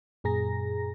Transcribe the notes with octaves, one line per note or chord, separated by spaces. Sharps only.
F#2 A#2 G#4 A#5 A#6